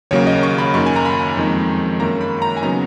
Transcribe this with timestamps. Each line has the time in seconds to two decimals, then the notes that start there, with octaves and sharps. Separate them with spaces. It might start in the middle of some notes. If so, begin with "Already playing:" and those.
0.11 D#2 C#3 F#3 A#3 C#5
0.27 D#5
0.43 C#6
0.58 B5
0.74 F#2 D#3 A#3 C#6
0.86 G#5
0.96 A#5
1.05 B5
1.37 F2 D#3 G#3 D#4
2.00 F#2 D#3 A#3 A#5
2.21 B5
2.42 A#5
2.57 G#5
2.62 C#3 F#3 B3 D#4 A#5